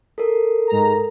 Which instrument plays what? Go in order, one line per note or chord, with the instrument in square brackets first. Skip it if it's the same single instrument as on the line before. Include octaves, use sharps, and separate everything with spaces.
[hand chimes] A4 A#4
[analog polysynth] G#2 A#5